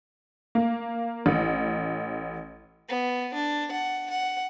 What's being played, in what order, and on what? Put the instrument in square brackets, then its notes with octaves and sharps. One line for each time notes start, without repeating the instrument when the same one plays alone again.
[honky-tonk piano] A#3
A1
[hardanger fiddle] B3
D4
F#5
F#5